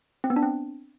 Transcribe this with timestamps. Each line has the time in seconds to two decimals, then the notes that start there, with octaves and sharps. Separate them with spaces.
0.24 C4
0.30 B3
0.36 D4
0.43 C4